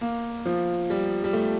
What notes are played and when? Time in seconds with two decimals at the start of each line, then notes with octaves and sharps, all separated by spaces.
0.01 A#3
0.46 F3
0.90 G3
1.24 G3
1.33 A3